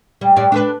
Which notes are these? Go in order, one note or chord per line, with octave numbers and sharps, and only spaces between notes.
G3
G2 G3 D5
D4 A4 B4